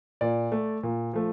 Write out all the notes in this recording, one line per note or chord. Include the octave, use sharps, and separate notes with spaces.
A#2 D5
A3
A#2
F3 A3